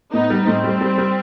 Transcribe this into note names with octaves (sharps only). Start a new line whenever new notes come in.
A2 B3 D#4
G3
A2 C4
G3
G3
G3